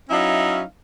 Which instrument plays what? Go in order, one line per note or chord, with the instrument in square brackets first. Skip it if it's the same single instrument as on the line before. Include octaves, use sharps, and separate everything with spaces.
[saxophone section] F#3 C#4 D#4 E4 E5 F5